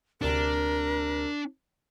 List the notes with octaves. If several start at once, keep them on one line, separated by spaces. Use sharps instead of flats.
D2 C3 D4 A#4